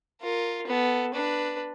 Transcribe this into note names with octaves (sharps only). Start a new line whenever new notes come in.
F4 A#4
B3 A4
D4 B4